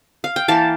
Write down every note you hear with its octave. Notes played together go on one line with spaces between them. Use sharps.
F5
G5
E3 A#3 F5 A5